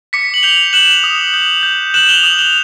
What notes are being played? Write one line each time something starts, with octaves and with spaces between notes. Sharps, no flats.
D6 B6 C#7
F#7
G6 F7 G7
F#6 E7 F#7
D#6
G6
G6
F#6 E7 F#7
F7 G7
D#6 E7 F#7
F7 G7